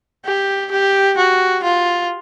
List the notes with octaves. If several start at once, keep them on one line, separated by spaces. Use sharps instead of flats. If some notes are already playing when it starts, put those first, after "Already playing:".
G4
G4
F#4
F4